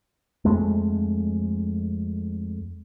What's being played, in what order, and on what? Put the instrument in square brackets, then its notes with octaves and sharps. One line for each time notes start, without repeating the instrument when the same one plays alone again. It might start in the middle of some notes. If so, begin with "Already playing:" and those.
[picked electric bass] F2 G#3 A3